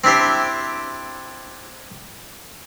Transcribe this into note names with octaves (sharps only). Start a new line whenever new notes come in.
C4 D4 E4 G4 C5